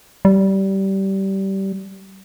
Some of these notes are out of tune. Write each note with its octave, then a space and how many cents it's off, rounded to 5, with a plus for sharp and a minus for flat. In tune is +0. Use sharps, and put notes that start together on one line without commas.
G3 -20